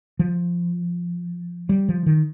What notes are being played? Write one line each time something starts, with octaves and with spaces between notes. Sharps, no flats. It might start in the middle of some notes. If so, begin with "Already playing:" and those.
F3
G3
F3
D#3